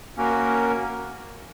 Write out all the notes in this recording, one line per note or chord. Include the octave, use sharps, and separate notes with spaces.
A#3 C#4 F#4 A#4